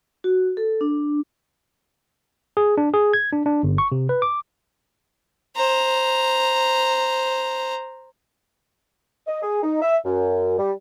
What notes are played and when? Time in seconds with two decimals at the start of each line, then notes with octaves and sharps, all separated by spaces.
0.24 F#4
0.57 A4
0.81 D4
2.57 G#4
2.77 D4
2.94 G#4
3.14 G#6
3.33 D4
3.46 D4
3.63 G1
3.78 C#6
3.92 C3
4.09 B4
4.22 D6
5.56 C5 A#5
9.27 D#5
9.43 G#4
9.63 D#4
9.82 E5
10.05 F#2
10.58 G3